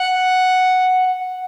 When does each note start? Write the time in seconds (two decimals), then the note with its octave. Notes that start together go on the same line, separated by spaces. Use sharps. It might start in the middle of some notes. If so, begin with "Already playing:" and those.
Already playing: F#5